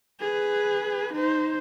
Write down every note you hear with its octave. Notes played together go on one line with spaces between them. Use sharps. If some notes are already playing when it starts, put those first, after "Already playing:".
G#4 B4
D#4 C5